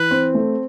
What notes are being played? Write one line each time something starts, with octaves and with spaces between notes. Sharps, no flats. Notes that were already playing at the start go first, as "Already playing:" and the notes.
Already playing: E3 B4
C4
A3